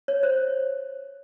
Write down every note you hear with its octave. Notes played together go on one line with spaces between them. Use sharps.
C#5
C5